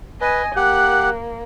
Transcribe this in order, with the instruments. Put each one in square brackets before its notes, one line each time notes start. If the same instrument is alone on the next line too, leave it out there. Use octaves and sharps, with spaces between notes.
[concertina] B4 [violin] D#5 G#5
[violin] A#3 [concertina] G4 F#5 [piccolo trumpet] F#6